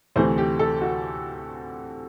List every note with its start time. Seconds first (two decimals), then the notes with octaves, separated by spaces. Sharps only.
0.16 D2 C3 E3 A3 C5
0.38 G4
0.59 A4
0.82 F#4